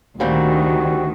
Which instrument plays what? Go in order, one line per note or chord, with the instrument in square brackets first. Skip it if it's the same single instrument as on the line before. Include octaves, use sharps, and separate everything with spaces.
[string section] D2 D#3 [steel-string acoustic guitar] A#2 G3 C4 [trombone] F#4